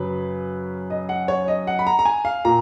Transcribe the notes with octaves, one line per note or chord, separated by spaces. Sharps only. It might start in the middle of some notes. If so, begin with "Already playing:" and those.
Already playing: F#2 C#3 F#3 B4
D#5
F#5
C#5
D#5
F#5
B5
A#5
A#5
G#5
F5
A#2 A#5